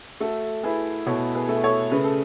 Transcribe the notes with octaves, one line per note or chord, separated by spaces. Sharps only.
A3 F#4 A4
E4 G#4 B4
B2 A4 C#5
G#4 B4
A3
A4 C#5
C#3 B4
A4